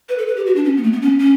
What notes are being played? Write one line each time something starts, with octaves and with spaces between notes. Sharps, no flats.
B4
A4
B4
G4
F#4
D4
C#4
B3
A3
B3
C#4
C#4